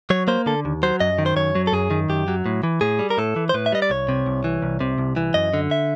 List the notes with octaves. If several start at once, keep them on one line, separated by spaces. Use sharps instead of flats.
F#3 C#5
A#3 C5
D3 A4
D#2
F#3 C5
F#2 D#5
D#3
C5
F#2 C#5
F#3
A4
F#2 G#4
D#3
F#2 G4
F#3
A2
E3
A2 G#4
G3
A#4
A2 A4
E3
C5
A2 B4
E5
G3 D#5
D5
C2 C#5
C3
C2
E3
C2
C3
C2
E3
F#2 D#5
D3
E5